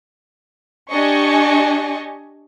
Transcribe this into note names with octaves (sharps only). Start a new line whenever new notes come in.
D4 G4 D#5 G#5 C#6